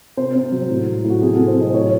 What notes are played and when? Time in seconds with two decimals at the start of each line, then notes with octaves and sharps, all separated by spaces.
0.17 C3 C5
0.36 C3
0.52 F#3
0.70 A2
0.87 F#3
1.04 A2
1.10 F#4
1.21 C3 G#4
1.35 C3 A4
1.48 C5
1.56 F#3 D#5
1.70 C5
1.74 A2 C#5